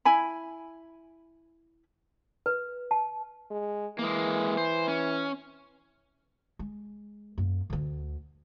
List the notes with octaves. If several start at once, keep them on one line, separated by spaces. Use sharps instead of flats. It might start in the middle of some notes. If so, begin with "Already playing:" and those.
E4 G#5 B5
B4
A5
G#3
E3 G#3 A#3
C5
C#4
G#3
F#2 A#3
D2 D3